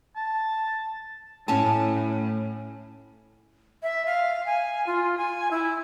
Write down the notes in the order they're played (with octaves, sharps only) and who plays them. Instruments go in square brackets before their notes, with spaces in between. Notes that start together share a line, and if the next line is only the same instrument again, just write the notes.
[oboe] A5
[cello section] A2 [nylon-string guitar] C#4 G#5 A5
[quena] E5
F5
G#5
F4
G#5
E4